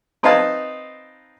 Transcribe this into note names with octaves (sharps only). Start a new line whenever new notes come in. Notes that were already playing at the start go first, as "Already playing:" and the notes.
C4 D#4 B4 E5 F5 A5